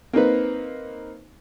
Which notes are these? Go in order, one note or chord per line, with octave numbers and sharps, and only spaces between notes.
A#3 C4 D#4 B4